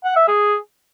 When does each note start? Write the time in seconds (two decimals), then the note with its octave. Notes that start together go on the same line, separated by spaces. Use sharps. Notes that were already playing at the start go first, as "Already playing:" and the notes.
0.04 F#5
0.16 E5
0.28 G#4